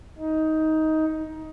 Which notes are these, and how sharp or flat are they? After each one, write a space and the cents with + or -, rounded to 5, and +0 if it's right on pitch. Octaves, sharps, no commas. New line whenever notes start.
D#4 +15